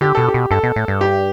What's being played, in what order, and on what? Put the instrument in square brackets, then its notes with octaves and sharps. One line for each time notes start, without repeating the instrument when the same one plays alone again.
[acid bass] D3 [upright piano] G4
[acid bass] B2 [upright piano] A4
[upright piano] G4
[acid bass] B2
[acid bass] G2 [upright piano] A4
[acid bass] B2
A2
G2
[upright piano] G4